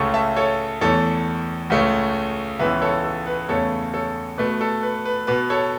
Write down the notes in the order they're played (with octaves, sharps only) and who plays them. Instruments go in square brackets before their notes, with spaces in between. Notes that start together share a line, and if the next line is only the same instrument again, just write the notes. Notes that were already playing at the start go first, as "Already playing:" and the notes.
Already playing: [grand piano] C#2 C#3 A3 A5 C#6
E5 A5
A4 C#5
E2 E3 A3 A4 C#5
C#2 C#3 A3
C#2 C#3 E3 B3 B4 E5
A4 C#5
A4
B4
E2 C#3 A3 A4 C#5
A4 C#5
B2 A3 B4
A4
B4
B4
B2 B3 B4
A4 C#5